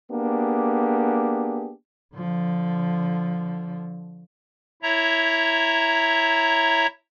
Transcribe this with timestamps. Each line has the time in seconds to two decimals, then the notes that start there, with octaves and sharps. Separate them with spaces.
0.11 A#3 B3 D4 G4 G#4
2.14 D3 F3
4.83 E4 C#5 E5 A#5